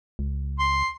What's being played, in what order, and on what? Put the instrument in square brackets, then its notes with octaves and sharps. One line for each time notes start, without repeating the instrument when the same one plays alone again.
[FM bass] C#2
[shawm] C6